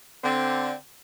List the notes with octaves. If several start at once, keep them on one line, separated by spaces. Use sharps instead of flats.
D3 C4